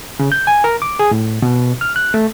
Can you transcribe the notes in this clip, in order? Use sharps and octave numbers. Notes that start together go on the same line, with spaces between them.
C#3
G6
G#5
A#4
D6
G#4
A2
B2
F6
F#6
A3